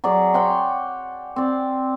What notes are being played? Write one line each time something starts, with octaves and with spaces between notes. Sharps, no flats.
F#3 G#4 D5
C#5 F#5 G5 C6
C4 D5